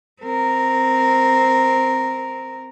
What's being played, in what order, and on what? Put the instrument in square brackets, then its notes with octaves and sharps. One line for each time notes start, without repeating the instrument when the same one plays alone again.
[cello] C4 A#4